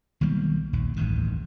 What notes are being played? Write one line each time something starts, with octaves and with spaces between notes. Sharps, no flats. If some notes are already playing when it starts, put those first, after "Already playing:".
B1 D#3 G3 A#3
A#1 D#2
D1 A1 G2 D#3